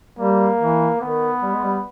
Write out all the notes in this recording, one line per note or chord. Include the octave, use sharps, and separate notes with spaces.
G3 A#3
E3
D#3 B3
G3
G#3
G3